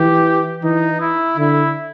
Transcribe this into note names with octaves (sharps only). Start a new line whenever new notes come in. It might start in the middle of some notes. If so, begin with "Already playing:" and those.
Already playing: E3 G4
E3 D#4
E4
D3 E4